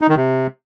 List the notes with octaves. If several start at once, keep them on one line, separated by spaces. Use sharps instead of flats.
D#4
D#3
C3